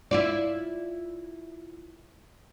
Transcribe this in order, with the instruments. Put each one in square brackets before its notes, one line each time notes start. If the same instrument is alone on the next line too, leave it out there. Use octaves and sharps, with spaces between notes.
[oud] E4 F4 D5